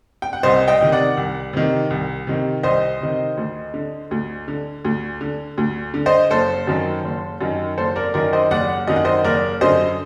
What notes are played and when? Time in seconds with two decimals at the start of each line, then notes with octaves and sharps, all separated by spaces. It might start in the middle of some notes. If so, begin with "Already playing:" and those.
0.22 G5
0.33 F#5
0.43 C2 C5 D#5
0.68 D#5 G5
0.81 C3 D#3
0.92 D5 F#5
1.17 C2
1.53 C3 D#3
1.90 C2
2.27 C3 D#3
2.63 C2 C5 D#5
3.01 C3 D#3
3.37 D2
3.74 D3
4.11 D2
4.48 D3
4.85 D2
5.21 D3
5.58 D2
5.94 D3
6.06 C5 D#5
6.31 F#1 A4 C5
6.67 F#2 D#3
7.05 F#1
7.41 F#2 D#3
7.78 F#1 A4 C5
7.96 A#4 D5
8.14 F#2 D#3 A#4 D5
8.33 C5 D#5
8.51 F#1 D5 F#5
8.87 F#2 D#3 D#5
8.96 F#5
9.05 C5 D#5
9.24 F#1 A#4 D5
9.61 F#2 D3 C5 D#5